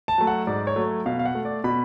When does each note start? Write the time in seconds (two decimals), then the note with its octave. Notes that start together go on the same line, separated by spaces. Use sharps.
0.08 A5
0.18 F#3 A3
0.27 F#5
0.47 G#2 D5
0.67 C#5
0.76 F#3 A3
1.06 B2 F5
1.19 F5
1.25 F#5
1.35 A3
1.45 D5
1.64 B2 B5